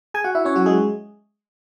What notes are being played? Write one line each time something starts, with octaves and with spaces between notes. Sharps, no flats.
G#4 G#5
F#4 F#5
E4 E5
C#4 C#5
F#3 F#4
G#3 G#4